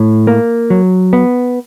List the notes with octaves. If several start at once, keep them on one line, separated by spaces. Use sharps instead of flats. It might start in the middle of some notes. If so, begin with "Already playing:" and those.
Already playing: A2
A#3
F#3
B3